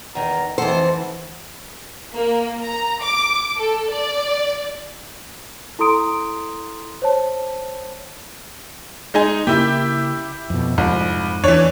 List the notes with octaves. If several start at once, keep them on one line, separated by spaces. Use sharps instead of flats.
E2 D#3 A#5
F2 E3 A4 C5 F#5
A#3
A#5
D6
A4
D5
E4 A4 A#5 C6 D#6 D7
C5 C#5 A5
G#3 D#4 G#4
C#3 A#3 E4 G4
F2 B2
C2 F2 G#2 F3
E2 E3 D4 C#5